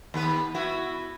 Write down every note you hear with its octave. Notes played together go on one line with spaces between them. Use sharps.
D#2 B3 B4
B3 E4 F#4